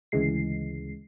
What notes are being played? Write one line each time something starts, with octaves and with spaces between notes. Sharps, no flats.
D2 C#3 E3 G#3 C7